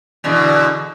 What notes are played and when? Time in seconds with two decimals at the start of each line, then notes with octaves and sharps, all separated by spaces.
0.24 E2 B2 D3